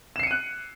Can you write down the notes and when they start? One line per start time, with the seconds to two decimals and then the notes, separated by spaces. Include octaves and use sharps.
0.16 E7
0.19 C7
0.23 C#7
0.27 D#7
0.31 F#6